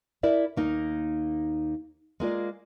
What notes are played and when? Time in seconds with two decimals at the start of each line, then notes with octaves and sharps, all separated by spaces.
0.23 E4 A#4 D5 E5
0.57 D#2 A#3 D#4
2.20 G#3 A#3 F4 D5